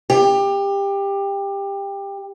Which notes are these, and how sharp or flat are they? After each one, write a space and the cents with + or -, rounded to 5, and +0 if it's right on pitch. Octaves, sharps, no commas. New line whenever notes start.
G4 +20